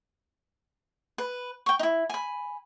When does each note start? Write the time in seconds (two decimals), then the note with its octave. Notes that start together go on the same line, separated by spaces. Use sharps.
1.18 B4
1.66 G5 C#6
1.79 D#4 E4
2.09 G#5 B5